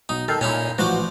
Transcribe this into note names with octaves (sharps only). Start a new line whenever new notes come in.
B1 D#4 D#6
D#3 A4 F6 G6 C7
A#2 C#4 D#4 E4
A1 F3 F4 F#4 B4 C5 D5